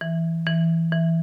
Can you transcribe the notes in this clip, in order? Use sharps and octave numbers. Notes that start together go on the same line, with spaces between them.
E3
E3
E3